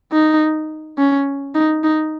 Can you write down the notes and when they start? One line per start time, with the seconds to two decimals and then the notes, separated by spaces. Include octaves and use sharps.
0.12 D#4
0.98 C#4
1.55 D#4
1.84 D#4